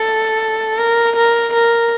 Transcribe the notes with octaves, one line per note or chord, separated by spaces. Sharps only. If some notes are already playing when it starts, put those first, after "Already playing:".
Already playing: A4
A#4
A#4
A#4